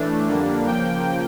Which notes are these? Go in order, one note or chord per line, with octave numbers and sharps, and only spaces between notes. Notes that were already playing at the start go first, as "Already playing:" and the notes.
Already playing: A2 E3 A3 D4
F2 D3 G3 A#3 D4
C#3 F3 A#3 G5